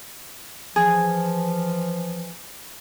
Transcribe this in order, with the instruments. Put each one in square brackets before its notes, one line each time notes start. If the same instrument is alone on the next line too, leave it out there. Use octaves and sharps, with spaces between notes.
[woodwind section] E3 F3 [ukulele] G#4